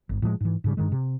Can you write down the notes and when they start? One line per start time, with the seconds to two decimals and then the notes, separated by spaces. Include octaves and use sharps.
0.09 G1
0.22 A2 F3 F#3 G#3
0.41 G#2 E3
0.64 G#2 C#3 G3
0.77 G2 D#3 G#3
0.92 C3